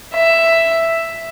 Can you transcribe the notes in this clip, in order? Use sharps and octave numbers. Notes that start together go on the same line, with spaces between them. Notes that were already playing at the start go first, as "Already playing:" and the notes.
E5